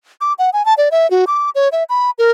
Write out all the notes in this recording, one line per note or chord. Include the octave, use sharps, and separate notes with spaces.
D6
F#5
G#5
A5
D5
E5
F#4
D6
C#5
E5
B5
A#4